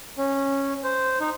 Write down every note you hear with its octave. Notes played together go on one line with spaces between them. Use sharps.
C#4
C5
D#4